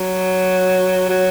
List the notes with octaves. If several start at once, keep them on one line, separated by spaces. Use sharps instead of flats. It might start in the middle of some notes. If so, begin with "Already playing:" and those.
Already playing: F#3
F#3